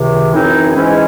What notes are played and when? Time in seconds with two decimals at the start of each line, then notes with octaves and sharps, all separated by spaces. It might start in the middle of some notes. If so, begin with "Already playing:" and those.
Already playing: C#2 C3 D#3
0.32 F#2 E3 C4 D#4 G#4
0.75 G#2 E3 G#3 C#4